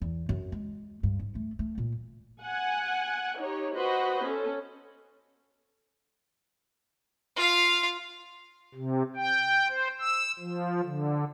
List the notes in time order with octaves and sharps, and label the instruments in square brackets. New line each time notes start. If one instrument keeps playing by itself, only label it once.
[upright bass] E2
F#2
G#3
G2
G#2
A3
A3
A#2
[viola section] F#5 G#5
D#4 G4 C#5
F#4 B4 C5 D#5 B5
C#4 A4
[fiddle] F4 F5
[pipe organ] C3
G5
C5
E6
F3
D3